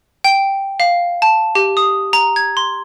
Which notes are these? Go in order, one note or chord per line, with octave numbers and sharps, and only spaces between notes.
G5
F5
A5
G4
D#6
A#5
G#6
C6